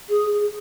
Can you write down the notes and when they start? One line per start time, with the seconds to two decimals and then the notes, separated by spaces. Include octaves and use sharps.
0.09 G#4